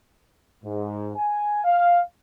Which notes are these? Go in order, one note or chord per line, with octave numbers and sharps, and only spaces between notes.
G#2
G#5
F5